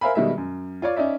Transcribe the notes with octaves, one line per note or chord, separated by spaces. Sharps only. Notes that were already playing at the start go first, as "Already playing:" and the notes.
A#4 C5 E5 F5 G#5 B5
B2 D#3 G3 G#3 E5
F#2
F4 C#5 D5
C#4 D#4 D5 E5